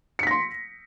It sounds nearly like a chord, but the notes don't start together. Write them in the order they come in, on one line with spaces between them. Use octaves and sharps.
C#7 B6 A#6 C6